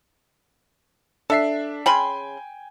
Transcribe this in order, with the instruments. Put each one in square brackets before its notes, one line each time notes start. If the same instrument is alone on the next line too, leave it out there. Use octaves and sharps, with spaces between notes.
[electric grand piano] D4 E5 C7 [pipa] A4
[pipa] C#3 B5 C6 [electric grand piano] G5 G#5